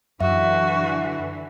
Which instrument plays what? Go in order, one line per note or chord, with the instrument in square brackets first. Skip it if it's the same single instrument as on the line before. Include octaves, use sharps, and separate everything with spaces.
[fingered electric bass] F#2 [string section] D3 E3 [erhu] F#4 [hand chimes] E5